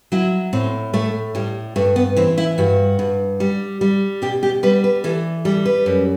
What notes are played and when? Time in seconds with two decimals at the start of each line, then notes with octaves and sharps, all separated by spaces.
0.12 F#3 E4
0.53 A2 C4
0.94 A2 A3
1.35 A2 G3
1.76 G2 A3
1.96 B3
2.16 E3 C4
2.38 E4
2.58 G2 F#4
2.99 G2
3.40 G3
3.81 G3
4.22 B2 G4
4.43 G4
4.63 G3 B4
4.84 B4
5.04 E3 A4
5.45 G3 A4
5.65 B4
5.86 F#2